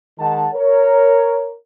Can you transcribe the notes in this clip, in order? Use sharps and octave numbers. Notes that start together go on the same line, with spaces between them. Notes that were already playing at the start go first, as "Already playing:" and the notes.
D#3 G#3 D#4 F#5 A5
A#4 C#5